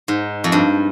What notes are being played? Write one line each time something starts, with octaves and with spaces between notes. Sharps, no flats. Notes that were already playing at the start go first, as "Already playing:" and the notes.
G#2
F2
G2